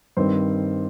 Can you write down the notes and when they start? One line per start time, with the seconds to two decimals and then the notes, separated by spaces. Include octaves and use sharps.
0.17 G2 D#3 C4 C5